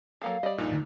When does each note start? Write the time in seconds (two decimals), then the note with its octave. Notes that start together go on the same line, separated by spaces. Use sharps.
0.22 F#3 A#3 A4 F5
0.43 G3 D5 D#5
0.58 A#1 G2 A#2 D#4
0.71 D3 D#3 A3